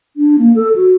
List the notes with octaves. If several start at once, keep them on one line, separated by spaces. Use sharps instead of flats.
D4
A#3
A4
F#4